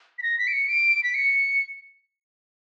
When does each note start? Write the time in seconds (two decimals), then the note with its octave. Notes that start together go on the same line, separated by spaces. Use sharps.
0.18 B6
0.23 A#6
0.39 B6
0.47 D7
0.53 C#7
0.68 D7
1.03 B6
1.14 C#7